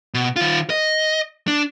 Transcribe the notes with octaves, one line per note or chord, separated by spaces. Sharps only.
B2
D#3 F4
D#5
D4